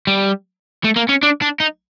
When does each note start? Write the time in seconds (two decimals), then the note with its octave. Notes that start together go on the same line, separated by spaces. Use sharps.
0.07 G3
0.84 A3
0.96 A#3
1.09 C#4
1.23 D4
1.42 D4
1.60 D#4